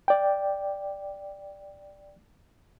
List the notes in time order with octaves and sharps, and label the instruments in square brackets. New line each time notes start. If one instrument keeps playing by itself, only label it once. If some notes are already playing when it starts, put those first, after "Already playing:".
[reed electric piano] D5 G5